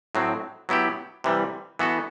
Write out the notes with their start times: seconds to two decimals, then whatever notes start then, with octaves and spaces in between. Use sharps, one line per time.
0.15 A2 F#3 C4
0.69 F#3 B3 E4 G4
1.24 C3 E3 G3
1.79 E3 B3 F#4 A4